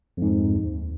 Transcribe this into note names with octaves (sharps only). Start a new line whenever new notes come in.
F2 G#2
D#2